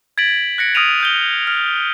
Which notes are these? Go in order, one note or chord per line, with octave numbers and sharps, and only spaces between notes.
G#6 A6 B6 D7 F#7
F#6 A#6 C#7 D7
D#6 F6 G#6 D7 D#7 F7
F6 G6 G7
F6